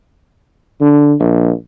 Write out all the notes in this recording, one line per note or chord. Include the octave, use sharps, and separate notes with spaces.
D3
A#1